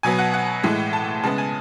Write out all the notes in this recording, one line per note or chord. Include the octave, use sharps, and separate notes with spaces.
B2 F#3 B3 G#5
F#5
F#5
A2 E3 G#3
A5
C#3 G#3 B3 A5
G#5